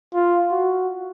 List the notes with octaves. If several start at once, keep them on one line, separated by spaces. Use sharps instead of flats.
F4
F#4